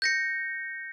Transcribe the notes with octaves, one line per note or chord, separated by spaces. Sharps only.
G6 A#6 C#7